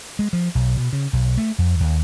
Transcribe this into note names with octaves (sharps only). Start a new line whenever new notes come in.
G#3
F3
B1
B2
C#3
B1
A3
F2
D#2